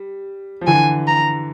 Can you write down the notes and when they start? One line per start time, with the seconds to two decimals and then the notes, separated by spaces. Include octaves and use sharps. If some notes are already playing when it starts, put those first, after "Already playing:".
Already playing: G3
0.61 F3
0.67 D3 E3 G#5
1.07 A#5